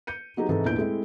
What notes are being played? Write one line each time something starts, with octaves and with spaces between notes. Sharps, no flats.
G6 C#7 D#7
F#3 B3 D#4 G4 G#4
G#2 C3 E3 D#4 A4
E2 A#2 D4 E4 G6 D7
G#3 A3 C4 E4